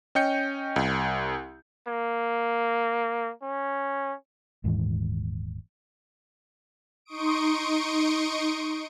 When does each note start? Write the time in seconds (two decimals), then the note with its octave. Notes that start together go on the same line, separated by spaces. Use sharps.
0.15 C#4 D#5 G5 G6 C#7
0.76 C2
1.88 A#3
3.43 C#4
4.64 D#1 D#2 G#2 E3
7.05 D#4 C6 C#6 D#6 D7